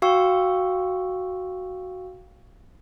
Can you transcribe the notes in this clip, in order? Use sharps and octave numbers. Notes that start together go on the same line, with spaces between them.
F#4 F5 G5 C#6 E6